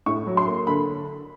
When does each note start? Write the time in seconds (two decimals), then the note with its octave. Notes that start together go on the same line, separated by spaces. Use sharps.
0.06 A2 C#6
0.27 F#3
0.37 C6
0.47 A#3
0.67 D3 B5